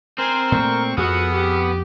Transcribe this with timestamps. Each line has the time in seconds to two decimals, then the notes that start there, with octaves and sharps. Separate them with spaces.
0.18 C4 A#4 C5 G#5
0.52 A#2 A3 C#6
0.97 F2 B3 F#4 G#4 F#5 E6 F6
1.34 G4